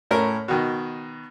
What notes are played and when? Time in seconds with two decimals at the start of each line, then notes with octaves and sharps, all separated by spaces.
0.11 A2 C#4 A#4
0.48 B2 D#3